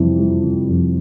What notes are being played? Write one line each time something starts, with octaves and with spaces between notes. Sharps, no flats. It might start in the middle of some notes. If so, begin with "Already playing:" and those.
Already playing: F2 C3 E3 G3
G3
C3
F2